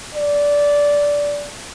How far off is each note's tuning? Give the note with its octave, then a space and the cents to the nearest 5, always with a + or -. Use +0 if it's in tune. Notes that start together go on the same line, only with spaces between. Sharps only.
D5 -15